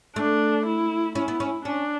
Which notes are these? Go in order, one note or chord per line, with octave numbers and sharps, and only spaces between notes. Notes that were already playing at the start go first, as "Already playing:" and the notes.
A3 D4
E4
C#4 E4
B3
C#4
C#4 D4